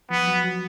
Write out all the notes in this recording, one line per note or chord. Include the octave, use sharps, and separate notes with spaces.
F3 B3
F3
F#3
F#3